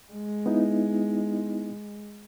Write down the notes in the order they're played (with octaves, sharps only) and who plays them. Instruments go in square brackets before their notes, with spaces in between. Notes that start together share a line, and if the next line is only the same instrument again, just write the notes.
[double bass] G#3
[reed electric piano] B3 D#4 E4